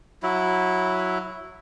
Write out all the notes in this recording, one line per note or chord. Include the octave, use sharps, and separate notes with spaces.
F#3 E4